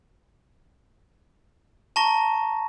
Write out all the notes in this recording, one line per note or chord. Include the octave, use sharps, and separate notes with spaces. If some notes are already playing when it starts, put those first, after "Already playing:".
A5 A#5 C#6 A#6